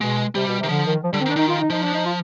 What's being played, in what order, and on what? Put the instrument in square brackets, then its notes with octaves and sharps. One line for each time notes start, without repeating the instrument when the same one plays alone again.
[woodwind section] B2 [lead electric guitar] G#3
[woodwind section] C3 [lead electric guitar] G3
[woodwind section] B2
C3
[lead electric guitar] D#3
[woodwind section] D3 [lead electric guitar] F3
[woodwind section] D#3
F3
[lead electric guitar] D3 [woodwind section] G3
[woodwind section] C4
[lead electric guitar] D#3
[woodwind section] D4
[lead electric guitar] D#3 [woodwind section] D#4
[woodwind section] F4
D#4
[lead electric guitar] F3 [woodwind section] D#4
[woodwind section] D4
D#4
F4